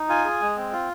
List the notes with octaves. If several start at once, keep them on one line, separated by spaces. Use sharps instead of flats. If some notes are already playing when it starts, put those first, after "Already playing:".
Already playing: D#4
F4 G#5
G#4
G#3
C4
F4